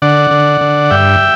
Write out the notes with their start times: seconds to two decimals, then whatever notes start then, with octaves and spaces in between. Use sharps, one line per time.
0.02 D3 D5 F#5
0.31 D3
0.61 D3
0.90 G2 E5 G5